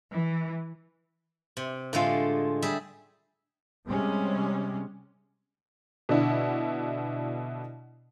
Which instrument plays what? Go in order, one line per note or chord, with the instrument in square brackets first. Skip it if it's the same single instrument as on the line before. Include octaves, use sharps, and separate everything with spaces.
[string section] E3
[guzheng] C3
[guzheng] A2 D3 G#3 [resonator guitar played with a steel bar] A3 F4
[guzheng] G3 G#4 E5
[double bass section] C3 G3 G#3 C4 C#4
[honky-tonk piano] B2 D3 D4 E4